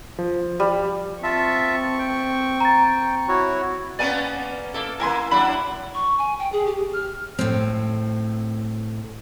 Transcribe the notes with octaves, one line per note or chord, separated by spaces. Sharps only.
F3
G3
C4 F4 E5 A5 C#6
G5
A#5 A6
E4 F#4 C#5
A#3 B3 C#4 D5 G#5 A5
A#3 E4 A4 D6
A#3 E4 A#4 G#5 C6
F#3 D4 E4 B5 D6
C#6
G#5
G5
G#4
G4
F6
A2 C4